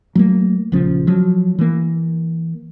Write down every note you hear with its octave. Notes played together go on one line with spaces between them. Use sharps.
F#3 A3 A#3
A#1 C#3 F3 C#4
F3 F#3
E3 A#3